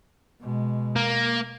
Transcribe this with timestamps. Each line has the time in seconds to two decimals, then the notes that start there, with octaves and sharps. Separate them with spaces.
0.41 B2 G#3
0.96 A#3